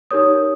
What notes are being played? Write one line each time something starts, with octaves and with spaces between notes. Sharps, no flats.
D#4 G4 A#4 C#5 D#6